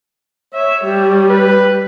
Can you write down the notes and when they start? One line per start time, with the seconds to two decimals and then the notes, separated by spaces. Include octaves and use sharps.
0.54 C#5 E5
0.84 G3
1.30 B4